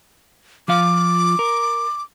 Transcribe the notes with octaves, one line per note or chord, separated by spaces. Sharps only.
F3 F4 F5 D6
A#4